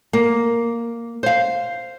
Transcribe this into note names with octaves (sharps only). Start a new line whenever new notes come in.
A#3
C5 F5